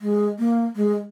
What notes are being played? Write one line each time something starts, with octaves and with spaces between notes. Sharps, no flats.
G#3
A#3
G#3